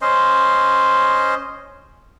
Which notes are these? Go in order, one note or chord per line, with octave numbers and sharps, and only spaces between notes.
C#4 C5 D#5 C6